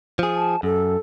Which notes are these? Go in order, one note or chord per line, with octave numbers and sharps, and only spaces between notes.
F3 G#4
A5
F#2 A4